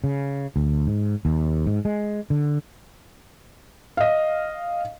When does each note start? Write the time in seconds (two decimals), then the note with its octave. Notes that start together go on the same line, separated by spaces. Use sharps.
0.04 C#3
0.56 D2
0.87 G#2
1.25 D#2
1.66 G#2
1.85 G#3
2.30 D3
3.97 D#5 F5